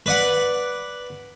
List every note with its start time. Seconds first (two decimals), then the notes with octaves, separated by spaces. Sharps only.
0.06 B4 D5 F#5